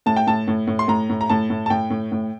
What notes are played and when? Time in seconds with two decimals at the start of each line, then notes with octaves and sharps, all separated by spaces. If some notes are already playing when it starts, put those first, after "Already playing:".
0.06 A2 A5
0.16 G5
0.27 A2 A5
0.48 A2
0.67 A2
0.79 C6
0.88 A2 A#5
1.10 A2
1.21 A#5
1.30 A2 A5
1.50 A2
1.66 A5
1.70 A2 G5
1.90 A2
2.12 A2